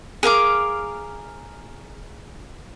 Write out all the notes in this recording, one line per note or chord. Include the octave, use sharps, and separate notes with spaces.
G#4 A#4 F5 D6